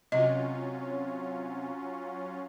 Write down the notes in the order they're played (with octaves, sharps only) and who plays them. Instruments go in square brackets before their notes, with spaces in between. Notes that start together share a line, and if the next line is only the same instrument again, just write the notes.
[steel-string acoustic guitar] C3 [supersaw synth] F#3 C#4 F4 [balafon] D#5